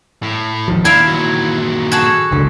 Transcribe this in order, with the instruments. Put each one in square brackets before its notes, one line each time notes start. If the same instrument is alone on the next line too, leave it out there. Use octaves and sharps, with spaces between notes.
[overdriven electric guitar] A2
[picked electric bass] D#2 D#3 F3
[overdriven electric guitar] A#2 D4 [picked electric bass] D#3 [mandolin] E4 E5 F5
[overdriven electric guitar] A#2 F#3
[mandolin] F#4 G#4 A4
[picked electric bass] F#1 C#2 D3